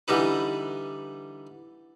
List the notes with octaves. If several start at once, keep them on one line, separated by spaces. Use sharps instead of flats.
D3 E3 G3 D#4 B4